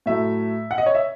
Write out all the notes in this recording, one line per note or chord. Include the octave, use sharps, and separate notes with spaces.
A2 F#3 A3 E5
F#5
D#5
C#5
E5